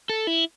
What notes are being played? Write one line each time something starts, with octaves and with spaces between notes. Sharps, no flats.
A4
E4